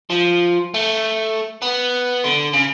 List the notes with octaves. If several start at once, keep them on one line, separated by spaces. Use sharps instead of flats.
F3
A3
B3
D3
C#3